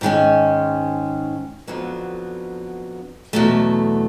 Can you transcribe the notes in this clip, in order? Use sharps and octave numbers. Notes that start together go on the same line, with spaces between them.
G#2 D#3 G#3 C#4
F2 D3 F#3 B3
E2 B2 F#3 A3